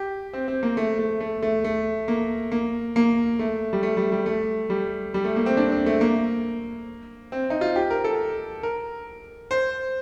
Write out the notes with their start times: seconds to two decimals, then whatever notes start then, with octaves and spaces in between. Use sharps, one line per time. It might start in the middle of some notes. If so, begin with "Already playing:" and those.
Already playing: G4
0.33 C4
0.48 C4
0.63 A#3
0.77 A3
0.99 A3
1.20 A3
1.42 A3
1.64 A3
2.08 A#3
2.52 A#3
2.96 A#3
3.39 A3
3.73 G3
3.83 A3
3.97 G3
4.12 G3
4.26 A3
4.70 G3
5.14 G3
5.24 A3
5.36 A#3
5.46 C4
5.57 D4
5.72 C4
5.86 A3
6.01 A#3
7.32 C4
7.50 D#4
7.61 F4
7.76 G4
7.91 A#4
8.04 A4
8.63 A#4
9.51 C5